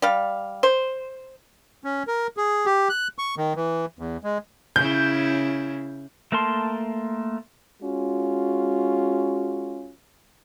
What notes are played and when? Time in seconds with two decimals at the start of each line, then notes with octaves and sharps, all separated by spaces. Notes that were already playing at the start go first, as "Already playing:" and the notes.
0.02 G3 F5
0.63 C5
1.84 C#4
2.07 A#4
2.37 G#4
2.66 G4
2.89 F#6
3.18 C#6
3.37 D#3
3.56 E3
3.99 E2
4.23 G#3
4.76 C#3 C#4 E4 G6
6.32 A3 A#3 A#4 A5 C6
7.82 G#3 C#4 F4 F#4